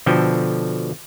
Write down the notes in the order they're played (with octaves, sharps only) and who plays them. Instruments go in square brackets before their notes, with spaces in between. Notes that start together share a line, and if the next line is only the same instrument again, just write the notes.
[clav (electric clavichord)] B2 D3 F3 A4 G5